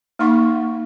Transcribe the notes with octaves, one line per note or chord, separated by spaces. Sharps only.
A#3 D#4 F#5 C6 C#6